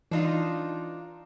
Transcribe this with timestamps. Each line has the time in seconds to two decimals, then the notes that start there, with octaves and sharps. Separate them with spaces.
0.11 E3 D4 D#4 F4